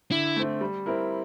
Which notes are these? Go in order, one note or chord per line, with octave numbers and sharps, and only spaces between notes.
D3 E4
A3 C4
G3
C4 E4 A#4